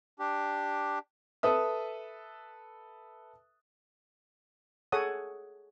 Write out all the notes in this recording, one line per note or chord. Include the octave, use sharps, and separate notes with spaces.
D4 G4
A4 B4 E5 D#6
G#4 A4 C#5 F#5 D#6